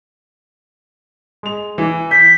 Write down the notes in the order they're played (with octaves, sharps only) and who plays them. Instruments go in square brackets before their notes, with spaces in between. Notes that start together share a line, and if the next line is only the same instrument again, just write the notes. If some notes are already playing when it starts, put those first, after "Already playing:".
[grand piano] G#3 F7
E3
[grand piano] G6 [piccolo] B6